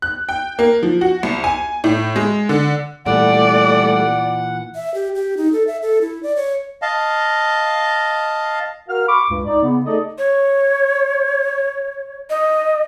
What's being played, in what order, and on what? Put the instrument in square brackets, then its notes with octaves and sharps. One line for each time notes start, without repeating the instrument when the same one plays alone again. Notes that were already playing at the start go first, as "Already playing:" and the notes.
[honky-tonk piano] F#6
G5
A#3
F3
F#4
C2
G#5
A2
G#3
D3
[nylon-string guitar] A#2 E3 [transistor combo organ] G3 A3 [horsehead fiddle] D5 [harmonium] F#5
[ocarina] E5
G4
G4
D#4
A4
E5
A4
E4
D5
C#5
[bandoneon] D#5 F5 A5
[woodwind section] F#4 A#4 F5 F6
B5 C#6 D6
C#2 G2
D#4 D5
C#3 B3
A3 D#4 G#4 A4 D5 D#5
[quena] C#5
D#5